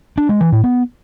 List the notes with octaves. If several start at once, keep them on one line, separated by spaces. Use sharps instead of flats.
D4
G#3
E3
A2
B3